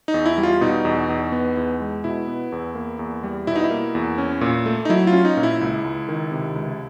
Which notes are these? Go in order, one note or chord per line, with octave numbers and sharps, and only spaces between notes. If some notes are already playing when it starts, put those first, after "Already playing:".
D#4
E2
E4
G3
F4
B2 D#4
E2
E2
B3
E2
G#3
B2 E4
B3
E2
A#3
E2
G3
B2 E4
D#4
E4
A#3
E2
C#4
A#2
A3
D#4
F#3 E4
F4
C#4
D#4
A#2
E4
C#2 E4
C#2
D#3
C3
C#2